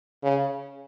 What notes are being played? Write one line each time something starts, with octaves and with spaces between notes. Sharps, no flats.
C#3